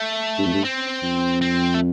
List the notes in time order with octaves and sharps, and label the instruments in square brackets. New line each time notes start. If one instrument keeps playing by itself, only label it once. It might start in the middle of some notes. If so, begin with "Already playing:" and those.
Already playing: [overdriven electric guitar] A3
[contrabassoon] G2
F2
G2
[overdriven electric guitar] C4
[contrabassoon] F2
[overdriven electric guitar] C4
A3